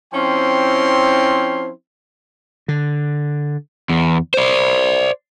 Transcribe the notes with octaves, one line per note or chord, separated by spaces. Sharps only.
F3 C4 C#4 E4 G5 C6
D3
E2
C5 D5